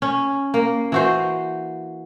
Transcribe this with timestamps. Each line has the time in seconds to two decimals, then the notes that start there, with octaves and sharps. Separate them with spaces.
0.02 C#4
0.54 A#3
0.92 E3 F#4 C5